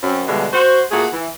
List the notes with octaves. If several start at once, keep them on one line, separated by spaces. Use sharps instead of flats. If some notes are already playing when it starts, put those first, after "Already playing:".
F#2 C4
B2 D3 E3 G3 G#3
F#4 C5
A#2 A3 F#4 G#4
E3